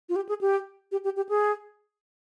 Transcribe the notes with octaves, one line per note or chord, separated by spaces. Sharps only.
F4
G4
G#4
G4
G4
G4
G4
G#4